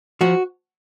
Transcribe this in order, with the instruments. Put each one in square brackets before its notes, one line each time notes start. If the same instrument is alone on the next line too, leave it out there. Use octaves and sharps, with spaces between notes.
[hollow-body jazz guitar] F3 F#4